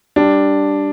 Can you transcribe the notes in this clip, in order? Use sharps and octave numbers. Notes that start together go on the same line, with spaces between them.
G3 D4